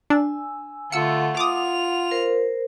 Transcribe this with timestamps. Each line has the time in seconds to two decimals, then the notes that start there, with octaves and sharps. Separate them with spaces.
0.10 D4 G#5 E6
0.92 D3 A3 F4 F#5 E6 C#7
1.37 F4 D6 D#6 F7
2.11 A#4 C5